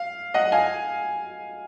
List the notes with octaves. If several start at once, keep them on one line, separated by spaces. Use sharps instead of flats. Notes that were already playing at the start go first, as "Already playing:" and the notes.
Already playing: F5
D#5 F#5
F5 G#5